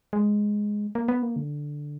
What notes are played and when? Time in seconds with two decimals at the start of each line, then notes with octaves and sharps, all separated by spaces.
0.13 G#3
0.95 A#3
1.08 B3
1.22 A#3
1.36 D3